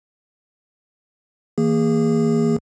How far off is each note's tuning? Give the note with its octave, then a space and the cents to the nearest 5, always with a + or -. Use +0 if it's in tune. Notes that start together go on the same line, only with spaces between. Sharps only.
E3 -30 A#3 -15 G#4 -20